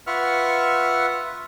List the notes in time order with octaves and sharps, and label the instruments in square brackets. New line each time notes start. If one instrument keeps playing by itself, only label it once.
[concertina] F4 B4 E5 F#5 C#6 F6